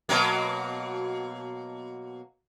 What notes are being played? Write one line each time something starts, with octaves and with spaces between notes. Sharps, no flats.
B2 F#3 A#3